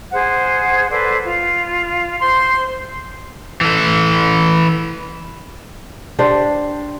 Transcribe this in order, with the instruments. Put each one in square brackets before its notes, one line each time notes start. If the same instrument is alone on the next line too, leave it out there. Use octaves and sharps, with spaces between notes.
[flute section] G#4 C5 F#5
A4 B4 C5 D5
F4
C5 C6
[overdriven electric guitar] E3 A4
[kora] D4 G4 C5